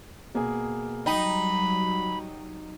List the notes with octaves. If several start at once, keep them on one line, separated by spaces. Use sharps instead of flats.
B2 A#3 G#4
F#3 G3 D#4 G5 B5